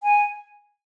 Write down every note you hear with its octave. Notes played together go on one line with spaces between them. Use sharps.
G#5